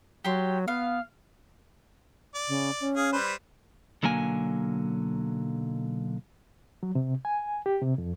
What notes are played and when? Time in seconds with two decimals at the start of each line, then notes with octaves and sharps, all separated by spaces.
0.25 F#3 G4 C6
0.68 B3 F5
2.35 D5
2.48 C#3
2.81 C#4
2.96 G#4 F5
3.13 G3 B4 C5
4.03 B1 D3 F#3 A#3 G#5
6.83 F#3
6.95 C3
7.25 G#5
7.66 G4
7.82 C3
7.98 F2